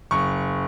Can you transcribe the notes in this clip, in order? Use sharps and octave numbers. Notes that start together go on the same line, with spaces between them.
F#1 C#6